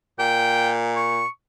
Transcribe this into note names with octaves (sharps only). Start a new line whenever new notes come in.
A#2 G5
C#6